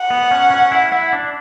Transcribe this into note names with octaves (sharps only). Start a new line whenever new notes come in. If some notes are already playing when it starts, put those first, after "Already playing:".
Already playing: F#5
B3
C#4
C#4
E4
E4
D4